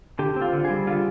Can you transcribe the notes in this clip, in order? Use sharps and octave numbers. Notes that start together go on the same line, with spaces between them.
D3 G4
C4
F4
D3
G#4
G3
D3 F4